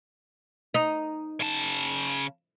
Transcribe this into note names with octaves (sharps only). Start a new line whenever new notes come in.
D#4
C#3 A5